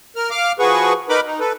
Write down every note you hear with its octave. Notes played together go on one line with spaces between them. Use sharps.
A#4 F6
F5 D6 F6
F3 F#4 G#4 B4 C#6
D#4 A#4 B4 B5 D6
D#4
A4 B4